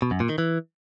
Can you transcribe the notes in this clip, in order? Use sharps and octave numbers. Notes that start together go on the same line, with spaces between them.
B2
F#2
A#2
D#3
E3